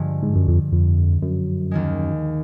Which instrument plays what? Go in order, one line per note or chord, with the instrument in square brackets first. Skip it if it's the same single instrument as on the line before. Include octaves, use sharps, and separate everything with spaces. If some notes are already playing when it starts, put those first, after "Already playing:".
Already playing: [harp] G2 D3 F3 G#3
[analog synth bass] G#2
F#2
F2
F2
F#2
[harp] D#2 D#3 G#3